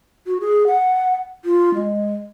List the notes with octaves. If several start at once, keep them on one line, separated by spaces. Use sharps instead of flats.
F#4
G#4
F#5
F4
G#3